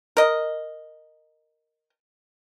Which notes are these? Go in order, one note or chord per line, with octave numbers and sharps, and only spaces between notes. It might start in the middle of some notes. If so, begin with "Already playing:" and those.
A#4 D#5